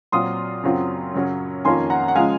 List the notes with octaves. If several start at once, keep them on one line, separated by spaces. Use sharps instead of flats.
A#2 F#3 C4 F4 C6 D#6
F#2 C#3 F#3 C4 F4
F#2 C#3 F#3 C#4
F2 D#3 A#3 C#4 F4 G#5 C6
F#5 A#5
F#5
C#3 F3 G#3 F5 G#5